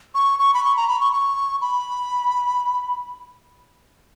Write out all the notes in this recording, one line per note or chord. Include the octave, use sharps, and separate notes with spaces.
C#6
C#6
B5
C#6
A#5
B5
C#6
C#6
B5